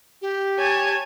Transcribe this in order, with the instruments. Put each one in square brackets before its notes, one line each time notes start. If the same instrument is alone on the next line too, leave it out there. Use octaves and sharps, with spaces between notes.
[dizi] G4
[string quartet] C#5 G#5 A5